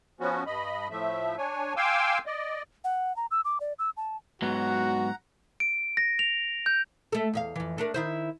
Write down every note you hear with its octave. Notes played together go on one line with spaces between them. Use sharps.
F3 B3 C#4 F#4
G2 D#5 B5
A2 F3 A3 E5
D4 C#5 G#5
F5 G5 G#5 C6 D6 E6
D5 D#5
F#5
A#5
E6
D6
D5
E6
A5
G#2 F#3 B3 F#4 F#5 A#5
D7
A#6
F7
G6
A3 A4
E2 E5 F5
F2 E3
A3 D4 A#4
D#3 E4 C5